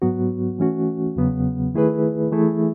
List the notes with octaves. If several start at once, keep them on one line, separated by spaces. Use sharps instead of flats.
G#2 F#3 B3 F#4
E3 A3 C#4 F#4
E2 C#3 F#3 B3
D#3 A3 E4 G#4 B4
E3 A3 E4 G#4